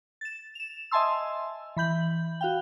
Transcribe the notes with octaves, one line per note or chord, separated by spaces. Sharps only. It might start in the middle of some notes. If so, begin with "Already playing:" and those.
A6 E7
E7 F7
D#5 E5 G#5 A5 C6 E6
E3 B5 G6 F#7
F#4 F5 G5